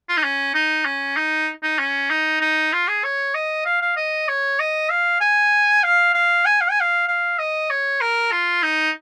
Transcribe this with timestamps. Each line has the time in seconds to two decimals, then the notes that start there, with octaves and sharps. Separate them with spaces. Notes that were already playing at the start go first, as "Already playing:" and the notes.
0.09 F4
0.17 D#4
0.24 C#4
0.55 D#4
0.86 C#4
1.17 D#4
1.63 D#4
1.79 C#4
2.10 D#4
2.41 D#4
2.73 F4
2.88 G#4
3.04 C#5
3.35 D#5
3.66 F5
3.82 F5
3.97 D#5
4.28 C#5
4.60 D#5
4.90 F5
5.21 G#5
5.84 F5
6.14 F5
6.46 G#5
6.61 F5
6.71 G#5
6.80 F5
7.08 F5
7.39 D#5
7.70 C#5
8.01 A#4
8.32 F4
8.63 D#4